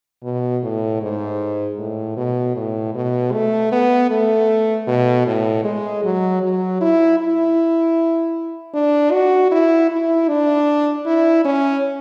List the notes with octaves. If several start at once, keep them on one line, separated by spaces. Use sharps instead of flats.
B2
A2
G#2
A2
B2
A2
B2
A3
B3
A3
B2
A2
G#3
F#3
F#3
E4
E4
D4
F#4
E4
E4
D4
E4
C#4